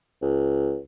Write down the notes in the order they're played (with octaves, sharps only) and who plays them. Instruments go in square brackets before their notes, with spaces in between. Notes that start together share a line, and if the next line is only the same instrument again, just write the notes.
[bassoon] C#2